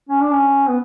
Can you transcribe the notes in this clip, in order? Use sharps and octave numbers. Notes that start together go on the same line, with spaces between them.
C#4
D4
C#4
B3